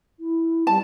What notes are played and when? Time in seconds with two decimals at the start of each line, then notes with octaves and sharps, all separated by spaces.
0.19 E4
0.67 G3 A5